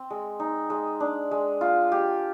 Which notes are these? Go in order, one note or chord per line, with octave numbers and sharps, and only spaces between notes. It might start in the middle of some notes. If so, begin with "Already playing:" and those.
Already playing: C4
G#3
D#4
G#3
D4
G#3
F4
G4